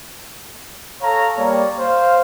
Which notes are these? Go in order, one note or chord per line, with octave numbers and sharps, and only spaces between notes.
A4 C#5 F5 A#5
G3 A#3 C#5 D5
C5 F5